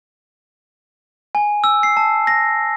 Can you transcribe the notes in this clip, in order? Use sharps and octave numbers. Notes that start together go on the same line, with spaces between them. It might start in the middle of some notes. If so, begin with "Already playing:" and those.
G#5
E6
C7
A5
A#6